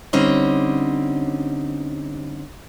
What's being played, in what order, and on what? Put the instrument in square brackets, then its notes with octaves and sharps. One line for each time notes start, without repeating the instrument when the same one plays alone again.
[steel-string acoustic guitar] D3 G3 C4 C#4 D#4